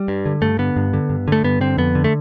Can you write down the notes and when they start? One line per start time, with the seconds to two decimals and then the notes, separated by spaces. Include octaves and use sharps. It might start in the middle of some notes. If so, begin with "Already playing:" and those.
Already playing: G3
0.08 G2
0.26 D3
0.42 G2 A3
0.59 D3 B3
0.76 G2
0.93 D3
1.09 G2
1.28 D3 A3
1.44 G2 B3
1.61 D3 C4
1.78 F2 B3
1.95 D3
2.04 A3